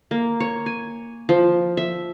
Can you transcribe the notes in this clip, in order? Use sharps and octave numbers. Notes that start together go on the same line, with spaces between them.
A#3
C#5
G#5
F3
E5